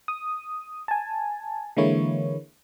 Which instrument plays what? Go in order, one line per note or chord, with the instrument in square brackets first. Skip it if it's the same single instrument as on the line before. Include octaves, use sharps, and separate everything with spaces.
[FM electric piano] D#6
G#5 A5
D3 E3 G#3 A#3 E4 C#5